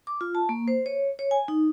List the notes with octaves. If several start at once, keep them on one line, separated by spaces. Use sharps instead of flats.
D6
F4
A5
A#3
C5
C#5
C#5
G#5
D#4